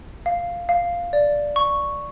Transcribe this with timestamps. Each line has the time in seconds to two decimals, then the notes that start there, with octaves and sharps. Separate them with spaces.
0.26 F5
0.69 F5
1.13 D5
1.56 C#6